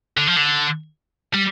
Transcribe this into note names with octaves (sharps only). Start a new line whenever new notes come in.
D3
F3
D3
G3